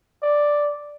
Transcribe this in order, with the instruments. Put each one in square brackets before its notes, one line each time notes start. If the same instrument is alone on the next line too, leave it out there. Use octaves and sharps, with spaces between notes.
[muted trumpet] D5